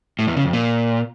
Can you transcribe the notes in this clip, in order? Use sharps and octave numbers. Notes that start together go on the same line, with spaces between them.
A2
E2
C#3
F2
A#2